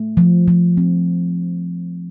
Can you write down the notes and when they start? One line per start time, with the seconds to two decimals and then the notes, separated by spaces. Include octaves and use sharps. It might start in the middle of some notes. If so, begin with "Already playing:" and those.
Already playing: A3
0.17 F3
0.48 F3
0.77 C4